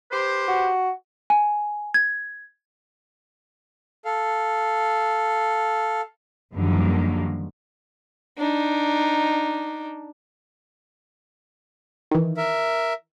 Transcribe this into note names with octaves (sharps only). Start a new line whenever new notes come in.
G4 B4 C5
F#4
G#5
G#6
A4 F5
F#2 D3 D#3 F3 G3 A#3
D4 D#4
D#3 E3
A#4 E5